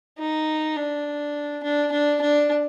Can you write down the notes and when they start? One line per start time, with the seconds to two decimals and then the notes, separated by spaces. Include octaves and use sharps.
0.19 D#4
0.76 D4
1.63 D4
1.92 D4
2.21 D4